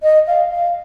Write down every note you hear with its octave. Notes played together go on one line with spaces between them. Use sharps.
D#5
F5
F5